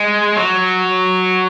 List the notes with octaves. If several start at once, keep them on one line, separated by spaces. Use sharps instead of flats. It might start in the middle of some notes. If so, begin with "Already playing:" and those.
Already playing: G#3
F#3